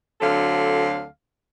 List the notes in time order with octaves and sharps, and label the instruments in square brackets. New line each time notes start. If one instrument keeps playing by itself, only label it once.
[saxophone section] D2 D3 F#3 C4 A4 F5